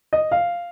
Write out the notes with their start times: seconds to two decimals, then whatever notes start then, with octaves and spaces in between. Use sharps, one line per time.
0.13 D#5
0.31 F5